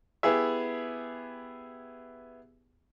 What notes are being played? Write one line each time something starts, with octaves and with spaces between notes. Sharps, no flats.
B3 E4 G4 G#4 E5